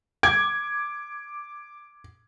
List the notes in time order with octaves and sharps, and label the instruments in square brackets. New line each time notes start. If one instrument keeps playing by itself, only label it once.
[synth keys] D6 [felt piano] G#6